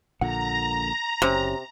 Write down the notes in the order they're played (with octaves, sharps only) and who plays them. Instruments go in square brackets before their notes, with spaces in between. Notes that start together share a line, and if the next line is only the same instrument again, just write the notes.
[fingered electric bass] A#1 A#2 D3 [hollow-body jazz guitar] F#5 [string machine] A#5
[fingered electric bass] F#1 [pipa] C3 [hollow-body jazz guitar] C#4 G4